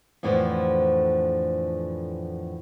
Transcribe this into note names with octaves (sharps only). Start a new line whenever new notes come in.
F2 A2 D3 E3 F3